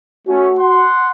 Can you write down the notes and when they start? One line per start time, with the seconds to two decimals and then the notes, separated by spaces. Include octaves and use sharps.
0.28 A3 C#4 F#4
0.58 F#5 C6